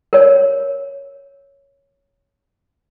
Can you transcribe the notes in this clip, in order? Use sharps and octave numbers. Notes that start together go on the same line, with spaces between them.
A#4 C#5